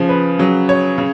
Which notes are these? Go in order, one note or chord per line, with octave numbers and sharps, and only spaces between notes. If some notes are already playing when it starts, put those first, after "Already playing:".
Already playing: C#3 F3
B4
C#3 F#3
C#5
C#3